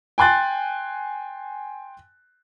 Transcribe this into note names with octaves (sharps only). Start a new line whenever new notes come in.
G5 G#5 C6 F#6 A6